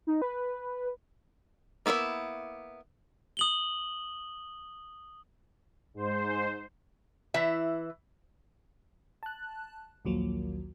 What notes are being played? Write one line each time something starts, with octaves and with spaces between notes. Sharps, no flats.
D#4
B4
A#3 B3 E4 C5 E5
D#6 F#7 G7
G#2 C5
E3 E4 E5
A5 F#6
A#1 D#2 F3 F#3 A#3